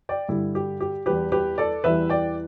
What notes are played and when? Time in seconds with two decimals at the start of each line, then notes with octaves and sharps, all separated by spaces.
0.09 D5 G5
0.29 G2 D3 G3 E4
0.55 G4
0.80 G4
1.06 E2 E3 G3 G4 B4
1.32 G4 B4
1.58 A4 D5
1.84 E2 E3 G3 B4 E5
2.10 D5 G5